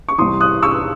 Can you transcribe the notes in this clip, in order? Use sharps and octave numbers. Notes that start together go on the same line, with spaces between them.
C#6
C2 C3 E3 C6 D#6
D#6 F#6
C#6 E6